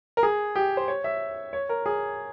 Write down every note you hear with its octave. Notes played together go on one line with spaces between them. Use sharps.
A#4
G#4
G4
C5
C#5
E5
C#5
A#4
G#4